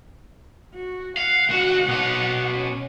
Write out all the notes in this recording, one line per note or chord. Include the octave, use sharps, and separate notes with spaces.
F#4
F5 F#5
C#2 F#4
B2 C#5
C#4